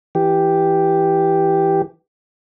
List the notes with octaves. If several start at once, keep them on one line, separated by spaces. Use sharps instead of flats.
E3 G4